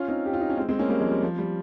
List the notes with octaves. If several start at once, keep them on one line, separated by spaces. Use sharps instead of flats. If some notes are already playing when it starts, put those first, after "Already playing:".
Already playing: C#4 F4
C4 D#4
G4
F4
D#4
C#4
G#3 C4
G#3 C4
A#3 C#4
G3 A#3
F3 G#3
G3
F3
G3